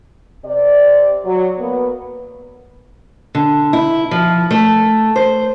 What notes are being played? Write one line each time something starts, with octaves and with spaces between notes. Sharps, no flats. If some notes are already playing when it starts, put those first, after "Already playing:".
C3 D5
F#3
A#3 B3
D3
E4
F3
A3
C5